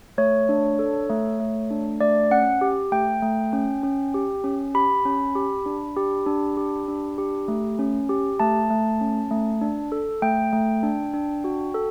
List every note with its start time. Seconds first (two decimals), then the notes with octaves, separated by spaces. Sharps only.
0.18 A3 C#5
0.49 D4
0.79 A4
1.10 A3
1.40 A3
1.70 D4
2.01 A3 D5
2.31 C#4 F#5
2.61 G4
2.92 A3 G5
3.22 A3
3.53 C#4
3.83 C#4
4.14 G4
4.44 C#4
4.75 G4 B5
5.05 C#4
5.35 G4
5.66 D4
5.97 G4
6.26 D4
6.57 G4
6.88 D4
7.18 G4
7.48 A3
7.79 C#4
8.09 G4
8.40 A3 A5
8.70 A3
9.01 C#4
9.31 A3
9.61 D4
9.92 A4
10.22 A3 G5
10.53 A3
10.83 D4
11.14 D4
11.44 F#4
11.74 A4